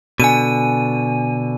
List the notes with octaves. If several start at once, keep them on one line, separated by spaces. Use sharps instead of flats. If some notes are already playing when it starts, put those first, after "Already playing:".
B2 D3 G#5 D#7